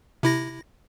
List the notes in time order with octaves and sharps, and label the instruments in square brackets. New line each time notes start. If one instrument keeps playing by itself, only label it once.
[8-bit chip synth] C3 E4 A#6